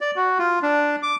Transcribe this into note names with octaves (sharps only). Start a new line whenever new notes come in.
D5
F#4
F4
D4
D6